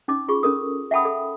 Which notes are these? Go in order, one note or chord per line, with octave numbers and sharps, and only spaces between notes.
C#4 D#4 D6
F4 G#4 C#6
C#4 A4 A#4 D#6
E5 F#5 G5 A5 B5 D#6
A4